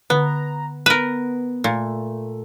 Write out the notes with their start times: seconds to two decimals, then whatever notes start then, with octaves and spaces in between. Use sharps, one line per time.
0.10 D3 B3 A#5
0.86 B3 A#4 B4
1.64 A#2 A3